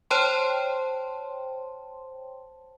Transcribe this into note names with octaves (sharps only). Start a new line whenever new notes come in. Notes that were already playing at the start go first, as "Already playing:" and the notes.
C5 C#5 G5 A5 C6